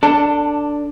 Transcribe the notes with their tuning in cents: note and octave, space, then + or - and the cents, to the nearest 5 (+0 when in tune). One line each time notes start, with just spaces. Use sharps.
D4 +0 A4 +25